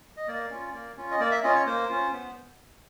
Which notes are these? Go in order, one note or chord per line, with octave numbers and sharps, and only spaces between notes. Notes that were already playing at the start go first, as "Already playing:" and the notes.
D#5
A#3 D5
C#4 F4
A#3
C#4 F4
D#5
A#3 D5
E5
C#4 F4 D#5
C#5
A#3 C5
C#4 F4
B3